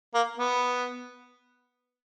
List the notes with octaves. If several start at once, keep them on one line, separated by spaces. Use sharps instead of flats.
A#3
B3